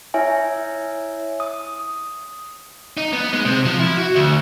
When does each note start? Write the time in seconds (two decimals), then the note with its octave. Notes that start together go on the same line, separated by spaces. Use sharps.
0.14 E4 C#5 E5 G#5
1.40 D#6
2.97 D#4
3.13 B3
3.33 G#3
3.45 C3
3.66 F3
3.80 E4
3.98 F#4
4.16 D2